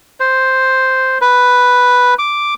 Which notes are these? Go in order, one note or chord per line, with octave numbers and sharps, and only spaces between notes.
C5
B4
D6